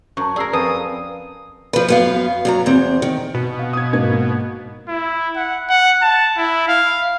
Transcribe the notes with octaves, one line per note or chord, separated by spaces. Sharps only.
F#2 A5 C#6
G#4 A#4 D5 E6 C7
F2 B4 G#5 A5 D#6
F3 B4
F#2 B3 F5
F#2 F#3 A#5
E2 C4
D#3
B2
F5
D#6 G#6
G#2 A#3 G#6
E4
F#5
F#5
A5
E4
F5